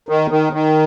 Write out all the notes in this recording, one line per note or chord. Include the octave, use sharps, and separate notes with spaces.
D#3
D#3
D#3